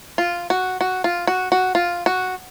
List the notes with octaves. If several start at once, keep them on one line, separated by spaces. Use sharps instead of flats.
F4
F#4
F#4
F4
F#4
F#4
F4
F#4